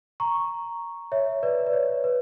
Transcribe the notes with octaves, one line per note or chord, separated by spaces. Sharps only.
A#5 C#6
C#5 E5
B4 D5
B4
C#5
B4